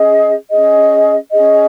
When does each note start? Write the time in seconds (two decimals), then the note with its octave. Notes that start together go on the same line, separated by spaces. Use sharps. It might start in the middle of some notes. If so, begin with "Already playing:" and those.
Already playing: C#4 G#4 D#5
0.50 C#4 G#4 D#5
1.31 C#4 G#4 D#5